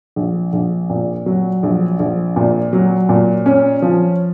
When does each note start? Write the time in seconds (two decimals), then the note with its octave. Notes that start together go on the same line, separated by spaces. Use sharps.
0.16 A#1
0.53 A#1
0.90 A#2
1.26 F#3
1.63 A#1
1.99 A#1
2.36 A#2
2.73 F#3
3.09 A#2
3.46 C#4
3.82 F3